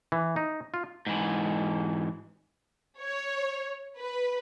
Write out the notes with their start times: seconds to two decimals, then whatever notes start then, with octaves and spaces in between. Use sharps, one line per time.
0.12 E3
0.36 D#4
0.74 F4
1.07 G#2 E3
2.98 C#5
3.98 B4